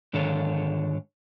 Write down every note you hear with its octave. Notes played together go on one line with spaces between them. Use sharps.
G#2 D3 D#3 A4 C#5